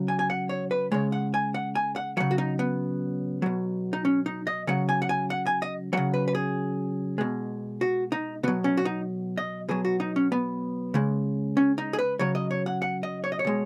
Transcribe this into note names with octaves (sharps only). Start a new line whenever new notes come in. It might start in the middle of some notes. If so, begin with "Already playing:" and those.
Already playing: C#3 F#3
G#5
G#5
F#5
C#5
B4
C#3 G#3 C#5
F#5
G#5
F#5
G#5
F#5
C#3 F#3 F#5
F#4
D#4
B3
B2 F#3
D#4
C#4
D#4
D#5
C#3 F#3 F#5
G#5
F#5
G#5
F#5
G#5
D#5
C#3 F#3 F#5
B4
B4
G#4
B2 G#3
F#4
D#4
B2 F#3 B3
C#4
F#4
D#4
D#5
B2 F#3 G#4
F#4
D#4
C#4
B3
C#3 G#3
C#4
D#4
G#4
B4
C#3 F#3 C#5
D#5
C#5
F#5
F#5
D#5
C#5
D#5
C#5
B2 G#3